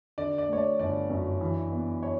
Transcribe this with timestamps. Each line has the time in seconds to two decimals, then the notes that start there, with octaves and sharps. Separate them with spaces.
0.18 D3 D5
0.38 D5
0.49 A3 C#5
0.58 D5
0.79 G1 D5
1.10 F#2
1.41 E3
1.72 B3
2.03 C#5